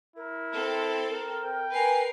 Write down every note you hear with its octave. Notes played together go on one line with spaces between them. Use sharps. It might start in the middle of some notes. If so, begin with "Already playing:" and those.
E4 A#4
C4 A4
A#4
G5
A#4 B4 G#5 C7